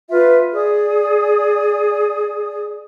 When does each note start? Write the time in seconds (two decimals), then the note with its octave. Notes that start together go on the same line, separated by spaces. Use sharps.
0.10 F4 B4 E5
0.54 G#4 D5 D#6